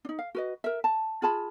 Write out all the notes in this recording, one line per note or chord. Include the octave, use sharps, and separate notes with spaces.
D4 D#4
F5
F#4 B4 D#5
A#4 E5
A5
F4 G#4 A5 B5